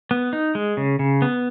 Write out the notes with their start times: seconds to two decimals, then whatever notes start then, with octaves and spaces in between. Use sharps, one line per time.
0.11 B3
0.33 D#4
0.55 G#3
0.77 C#3
0.99 C#3
1.22 B3